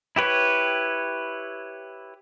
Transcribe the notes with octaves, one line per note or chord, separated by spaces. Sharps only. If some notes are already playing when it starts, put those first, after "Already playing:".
E4 G4 B4 C#5